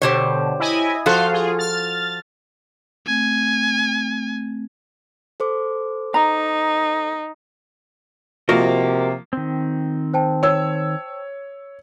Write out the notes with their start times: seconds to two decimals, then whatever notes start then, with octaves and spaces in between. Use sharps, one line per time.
0.02 B2 D3 G4 C5 C#5
0.60 E4 D#5 G#5
1.06 F3 F4 F#4 A4 C5 F5
1.33 F4 G#4
1.58 F6 A6
3.07 A3 C4 G#5
5.40 A4 C5 D6
6.14 D#4 A#5
8.49 C3 F3 A#3 F#4 A#4 D#5
9.33 D#3 C4
10.13 C5 G5 A5
10.43 C#5 E6